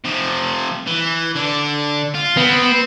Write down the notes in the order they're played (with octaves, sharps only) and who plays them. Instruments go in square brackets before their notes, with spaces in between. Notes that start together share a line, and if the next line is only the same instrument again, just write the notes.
[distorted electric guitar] C3 F3
E3
D3 D4
F4
[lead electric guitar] B3 [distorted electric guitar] C4